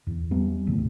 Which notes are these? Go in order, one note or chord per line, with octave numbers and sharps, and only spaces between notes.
E2
G3 B3
F1 D#2 A2 C3